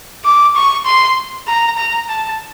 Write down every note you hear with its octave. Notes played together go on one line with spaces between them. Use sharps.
D6
C#6
C6
A#5
A#5
A5